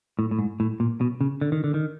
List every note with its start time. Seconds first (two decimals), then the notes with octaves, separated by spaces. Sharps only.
0.19 A2
0.31 A2
0.39 G#2
0.60 A2
0.80 A#2
1.01 B2
1.21 C#3
1.41 D3
1.52 D#3
1.64 D3
1.74 D#3